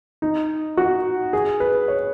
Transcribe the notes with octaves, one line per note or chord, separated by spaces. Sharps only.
D#4
F#4
G#4
B4
C#5